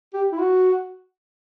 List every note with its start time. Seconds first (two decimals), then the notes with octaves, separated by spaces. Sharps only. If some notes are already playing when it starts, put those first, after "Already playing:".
0.14 G4
0.32 E4
0.39 F#4